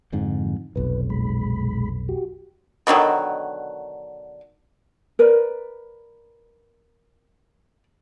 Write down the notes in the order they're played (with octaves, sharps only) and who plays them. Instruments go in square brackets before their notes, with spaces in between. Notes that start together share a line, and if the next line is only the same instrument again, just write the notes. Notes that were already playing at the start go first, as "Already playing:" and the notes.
[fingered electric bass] F2 G#2 [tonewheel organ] D3 F3
[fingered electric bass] F1 B1 [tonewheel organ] B4
[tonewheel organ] A#2 G#3 B5
F#4 G4
[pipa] B2 D3 D#3 F#3
[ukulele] A#4 B4 D5